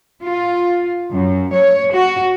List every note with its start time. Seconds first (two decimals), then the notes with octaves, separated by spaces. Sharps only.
0.24 F4
1.11 F#2
1.52 C#5
1.93 F#4